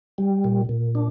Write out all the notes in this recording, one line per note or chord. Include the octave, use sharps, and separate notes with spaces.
G3
A#2
A#2
D4